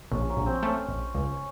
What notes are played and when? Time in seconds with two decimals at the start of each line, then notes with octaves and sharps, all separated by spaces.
0.12 A#1 C#4
0.30 F#3
0.37 A#1
0.46 C4
0.63 A3 C#4
0.89 A#1
1.15 C#2